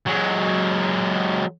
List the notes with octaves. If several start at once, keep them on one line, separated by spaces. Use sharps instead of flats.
F#3 G#3